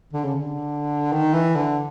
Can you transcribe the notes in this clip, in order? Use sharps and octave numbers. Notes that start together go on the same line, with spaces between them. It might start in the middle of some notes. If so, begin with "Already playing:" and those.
D3
C#3
D3
D#3
E3
D3